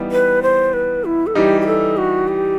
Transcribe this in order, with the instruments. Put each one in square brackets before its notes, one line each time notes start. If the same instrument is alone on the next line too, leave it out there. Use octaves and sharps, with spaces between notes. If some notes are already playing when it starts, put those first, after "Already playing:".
Already playing: [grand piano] E3 G3 B3 D#4
[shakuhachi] B4
C5
B4
E4
A4
[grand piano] E3 G3 D#4 [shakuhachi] G4
[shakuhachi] G4
A4
F#4
G4